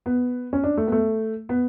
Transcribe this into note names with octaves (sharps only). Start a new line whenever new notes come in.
B3
C#4
D4
A3
B3
A3
B3